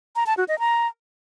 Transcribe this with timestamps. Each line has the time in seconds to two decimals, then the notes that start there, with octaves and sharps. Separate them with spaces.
0.16 A#5
0.27 A5
0.37 F#4
0.48 D#5
0.59 A#5